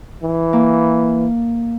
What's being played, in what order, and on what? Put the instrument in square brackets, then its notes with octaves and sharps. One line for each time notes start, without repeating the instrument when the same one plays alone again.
[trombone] E3
[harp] A#3